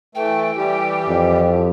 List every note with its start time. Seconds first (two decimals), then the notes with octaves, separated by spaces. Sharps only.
0.15 E3 A3 G5
0.56 E3 G3 G4
1.09 F2